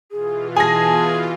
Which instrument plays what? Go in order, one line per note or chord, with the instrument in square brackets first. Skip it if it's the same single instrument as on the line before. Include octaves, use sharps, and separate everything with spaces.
[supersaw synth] B2 E3 F4 [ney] G#4
[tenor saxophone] G#4 [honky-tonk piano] G#5 A#6 [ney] A5